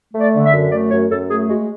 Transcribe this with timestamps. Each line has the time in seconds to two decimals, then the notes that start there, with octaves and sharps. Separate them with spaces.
0.14 A3
0.20 D5
0.33 D3
0.45 E5
0.52 F#2
0.71 A3 D5
0.91 F#2 C#5
1.10 F#2 A4
1.29 A3 G#4
1.49 G#3 F#4